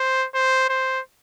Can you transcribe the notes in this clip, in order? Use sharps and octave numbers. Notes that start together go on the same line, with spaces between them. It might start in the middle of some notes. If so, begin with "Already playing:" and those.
Already playing: C5
C5
C5